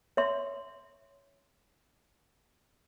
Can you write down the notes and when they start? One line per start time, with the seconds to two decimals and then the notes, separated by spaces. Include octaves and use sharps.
0.17 C#5 E5 C6